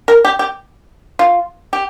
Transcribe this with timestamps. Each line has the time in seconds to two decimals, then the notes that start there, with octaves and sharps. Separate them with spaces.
0.08 A#4
0.25 G4
0.39 G4
1.19 F4
1.73 G4